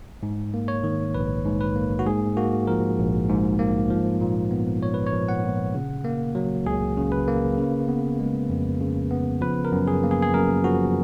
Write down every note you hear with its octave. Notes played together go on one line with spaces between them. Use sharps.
G#2
A#3
C#5
D#3
A#1 B4
G#2
B4
A#3
F#4
G#2 G#4
A#3 F#4
F3 A#4
A#1
G#2
A#3
F3
A#2
B3
A#2 C#5
B4
C#5
F3
F#5
A#2
C#3
A#3
F#3
C#2 G#4
C#3
B4
A#3
C#3
B3
G#3
F2
C#3
B3
F3 B4
A#4
F#2
G#4
A#3
G#4
G#4
F#2 A#4
F3 F#4